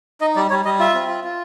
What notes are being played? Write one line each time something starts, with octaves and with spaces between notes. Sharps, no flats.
D#4 D#5
G3 D5
G3 C#5
G3 D#5
F4 E5
C4
F4
F4